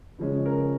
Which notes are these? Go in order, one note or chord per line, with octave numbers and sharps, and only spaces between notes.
C#3 F3 G#3 C#4
A#4